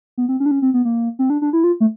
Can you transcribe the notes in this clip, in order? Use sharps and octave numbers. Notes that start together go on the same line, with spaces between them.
B3
C4
C#4
D4
C#4
C4
B3
A#3
C4
D4
D4
E4
F4
A3